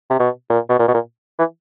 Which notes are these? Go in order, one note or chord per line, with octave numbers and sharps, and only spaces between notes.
C3
B2
A#2
B2
A#2
B2
A#2
E3